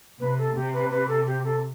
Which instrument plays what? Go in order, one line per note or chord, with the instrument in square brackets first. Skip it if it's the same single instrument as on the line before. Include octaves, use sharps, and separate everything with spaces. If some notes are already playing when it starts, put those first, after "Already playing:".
[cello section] C3 [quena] B4
[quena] A4
[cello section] C3 [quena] G4
[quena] B4
B4
A4
G4
A4